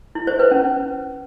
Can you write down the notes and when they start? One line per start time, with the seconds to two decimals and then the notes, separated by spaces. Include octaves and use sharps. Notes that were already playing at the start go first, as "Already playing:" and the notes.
0.15 E4
0.27 C5
0.39 B4
0.51 C#4